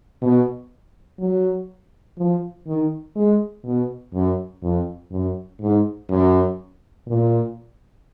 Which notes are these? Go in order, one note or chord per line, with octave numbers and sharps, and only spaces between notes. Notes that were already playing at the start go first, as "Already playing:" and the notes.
B2
F#3
F3
D#3
G#3
B2
F#2
F2
F#2
G#2
F#2
A#2